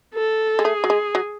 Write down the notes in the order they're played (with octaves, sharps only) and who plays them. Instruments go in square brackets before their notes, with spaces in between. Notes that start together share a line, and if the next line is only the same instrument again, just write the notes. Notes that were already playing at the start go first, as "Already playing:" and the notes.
[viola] A4
[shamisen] G#3
[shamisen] A3 [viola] G#4
[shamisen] F#3
G#3
F#3